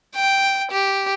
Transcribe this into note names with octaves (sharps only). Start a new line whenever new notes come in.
G5
G4